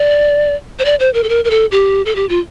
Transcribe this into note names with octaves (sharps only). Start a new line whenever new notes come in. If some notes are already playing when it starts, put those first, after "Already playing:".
Already playing: D5
C5
D5
C5
A#4
A4
A#4
A#4
A4
G4
A4
G4
F4